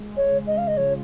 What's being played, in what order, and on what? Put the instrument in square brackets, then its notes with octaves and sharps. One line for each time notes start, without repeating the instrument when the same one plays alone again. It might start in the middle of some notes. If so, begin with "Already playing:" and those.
Already playing: [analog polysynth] G#3
[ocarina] C#5
[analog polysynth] C#3
[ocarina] D#5
F5
D#5
[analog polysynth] F3 [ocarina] C#5